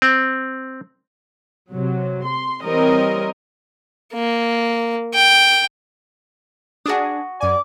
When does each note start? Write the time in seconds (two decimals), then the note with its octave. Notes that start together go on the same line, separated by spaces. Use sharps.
0.02 C4
1.70 C3 F#3
2.24 C6
2.64 E3 G3 C4 A#4 C#5 D#5
4.14 A#3
5.14 G5
6.86 D4 F#4 G#4 D#6
7.40 F#2 D5 G#5 D6